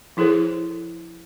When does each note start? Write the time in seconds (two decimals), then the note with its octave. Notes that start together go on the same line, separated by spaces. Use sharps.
0.17 F3 E4 G#4 A4 C5